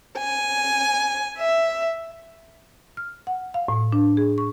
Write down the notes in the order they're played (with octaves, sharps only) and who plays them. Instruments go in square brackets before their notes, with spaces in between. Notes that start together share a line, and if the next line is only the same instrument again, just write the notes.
[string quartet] G#5
E5
[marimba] F6
F#5
F5
A2
D4
G#4
C#6